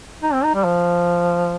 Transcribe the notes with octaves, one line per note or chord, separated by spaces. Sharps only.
D#4
C4
D#4
G3
F3